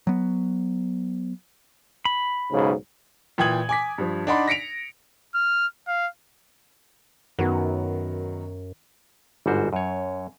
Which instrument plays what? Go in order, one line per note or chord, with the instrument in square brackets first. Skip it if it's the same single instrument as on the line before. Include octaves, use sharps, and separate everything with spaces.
[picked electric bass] F#3 B3
[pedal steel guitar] B5
[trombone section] B1 G#2 C#3
[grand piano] A#2 E3 G5 D#6 G#6 F#7
G#5 D6 B6
G2 F3
D4 D#4 D5 F#5 B5 C6
A#6 B6 C#7 D7 F7
[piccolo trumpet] F6
F5
[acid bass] F#2 [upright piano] D#3 F#3 B3
[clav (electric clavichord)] G1 G#2 G3 F#4 C5
F#2 C#5